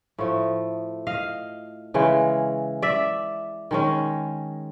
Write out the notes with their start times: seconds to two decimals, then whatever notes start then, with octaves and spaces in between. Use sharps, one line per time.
0.18 A2 F3 A3
1.07 D#5 F5
1.94 C#3 E3 G#3
2.82 D5 E5
3.71 D#3 G#3 C#4